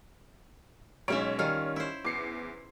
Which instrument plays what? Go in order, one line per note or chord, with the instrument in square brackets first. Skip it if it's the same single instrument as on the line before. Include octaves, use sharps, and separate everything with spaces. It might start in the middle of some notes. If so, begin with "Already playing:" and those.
[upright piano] B1 G#3 D7 [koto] B2 C#4 E5 [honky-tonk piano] C#5
[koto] D#3 C#4 F4 [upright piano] G3
[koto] E4 C5
[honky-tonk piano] E2 C7 C#7 [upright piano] D6